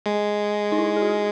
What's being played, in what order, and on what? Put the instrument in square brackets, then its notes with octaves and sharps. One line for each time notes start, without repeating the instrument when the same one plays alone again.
[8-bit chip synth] G#3
[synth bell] D#4
E4
G#4
F#4